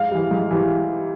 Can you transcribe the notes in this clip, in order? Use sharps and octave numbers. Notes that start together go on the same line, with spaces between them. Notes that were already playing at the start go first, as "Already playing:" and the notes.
Already playing: G#2 F5
E3 G3
G#2
E3 G3